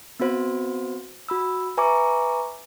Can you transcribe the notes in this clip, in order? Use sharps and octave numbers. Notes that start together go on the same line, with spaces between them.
B3 C4 F#4 C5
F#4 B5 E6
B4 E5 G#5 A#5 C#6 D6